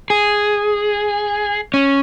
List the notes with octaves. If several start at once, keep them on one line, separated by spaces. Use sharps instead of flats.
G#4
C#4